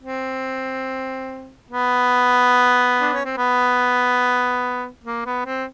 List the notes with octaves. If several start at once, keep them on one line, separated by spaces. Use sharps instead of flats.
C4
B3
D4
C#4
C4
B3
A#3
B3
C4